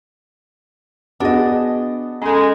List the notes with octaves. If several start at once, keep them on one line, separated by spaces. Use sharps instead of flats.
B3 D4 F#4 G#4 D#5
G#3 C#4 A4